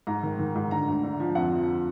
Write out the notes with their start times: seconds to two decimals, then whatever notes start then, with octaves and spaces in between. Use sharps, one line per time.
0.07 G#2 A#5
0.23 D#3
0.39 D#3
0.55 G#2
0.71 D3 A#5
0.88 D2
1.04 D3
1.20 F3
1.35 F2 F#5
1.52 F3